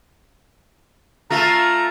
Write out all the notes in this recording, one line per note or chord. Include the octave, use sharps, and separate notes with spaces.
A3 F4 A4 A#5